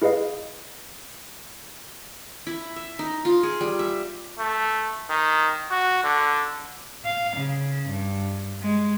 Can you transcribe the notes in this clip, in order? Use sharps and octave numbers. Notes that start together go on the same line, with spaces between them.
E4 G#4 B4 D#5 F5
E4
E5
D#4
F4
G#4
G3
E5
A3
D#3
F#4
D3
F5
C#3
G2
G#3